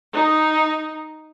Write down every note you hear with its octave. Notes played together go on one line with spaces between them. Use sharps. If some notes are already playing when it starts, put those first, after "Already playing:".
D#4